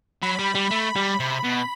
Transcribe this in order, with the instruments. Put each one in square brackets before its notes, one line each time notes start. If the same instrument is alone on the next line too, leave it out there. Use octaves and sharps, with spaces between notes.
[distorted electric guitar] F#3 [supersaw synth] B5
[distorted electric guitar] G3
G3
[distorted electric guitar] A3 [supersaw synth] B5
[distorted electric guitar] G3
[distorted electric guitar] C3 [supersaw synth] B5
[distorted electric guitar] B2